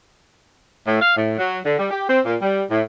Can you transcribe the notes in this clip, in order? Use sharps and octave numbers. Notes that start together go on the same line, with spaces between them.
A2
F5
A2
F#3
D3
G3
G4
C4
A#2
G3
A2